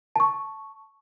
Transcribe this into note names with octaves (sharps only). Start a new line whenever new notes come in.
A5 C#6